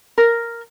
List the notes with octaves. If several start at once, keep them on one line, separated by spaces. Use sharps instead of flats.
A#4